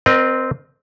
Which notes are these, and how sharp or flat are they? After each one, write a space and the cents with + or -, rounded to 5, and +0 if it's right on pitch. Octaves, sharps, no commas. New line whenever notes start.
C4 -10 A#4 +30 D#5 -25